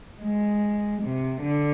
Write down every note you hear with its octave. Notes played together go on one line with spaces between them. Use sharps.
G#3
C3
D3